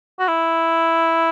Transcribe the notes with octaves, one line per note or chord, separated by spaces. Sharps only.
F#4
E4